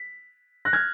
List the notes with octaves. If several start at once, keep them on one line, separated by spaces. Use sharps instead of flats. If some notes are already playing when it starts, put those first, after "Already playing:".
Already playing: B6
F#6 A#6
F6 G#6